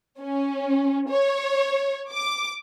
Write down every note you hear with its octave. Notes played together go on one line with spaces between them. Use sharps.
C#4
C#5
D6